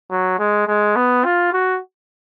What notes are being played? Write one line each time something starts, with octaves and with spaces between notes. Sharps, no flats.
F#3
G#3
G#3
B3
F4
F#4